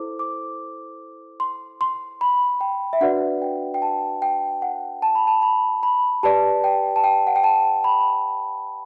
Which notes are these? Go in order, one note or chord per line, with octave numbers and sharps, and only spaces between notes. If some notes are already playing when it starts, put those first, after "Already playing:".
Already playing: E4 A4 C5 D6
D6
C6
C6
B5
G5
E5
D4 F#4 B4 D5 F#5
G5
G5
A5
G5
F#5
A5
B5
A5
B5
B5
G4 B4 D5 A5
G5
A5
G5
F#5
G5
A5
B5